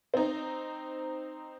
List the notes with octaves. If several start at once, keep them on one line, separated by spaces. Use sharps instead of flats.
C4 D#4